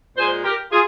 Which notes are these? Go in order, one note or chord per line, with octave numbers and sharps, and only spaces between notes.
A#2 G#3 G#4 C5
G4 A#4
F4 G#4